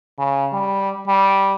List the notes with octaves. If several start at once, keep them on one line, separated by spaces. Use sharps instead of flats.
C#3
G3
G3